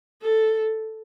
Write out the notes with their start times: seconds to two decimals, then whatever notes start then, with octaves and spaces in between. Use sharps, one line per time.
0.22 A4